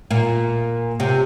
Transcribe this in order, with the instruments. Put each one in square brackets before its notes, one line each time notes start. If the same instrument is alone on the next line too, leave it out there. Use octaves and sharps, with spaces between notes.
[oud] A#2
C3